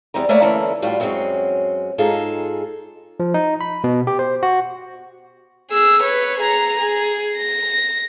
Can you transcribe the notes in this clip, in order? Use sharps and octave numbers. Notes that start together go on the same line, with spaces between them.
E2 G3 C4 A#5
A3 A#3 C#5 D5 E5 F#5
D3 E3 A3 A#3 C#4
A2 G3 F4 F#4
F#2 F#3 G#3 A#3 C4 C#4
G#2 D#4 F4 G#4 A4
F3
D#4
B5
B2
G4
C5
F#4
G#4 E6
B4 C#5
G#4 A#5
G#4
A#6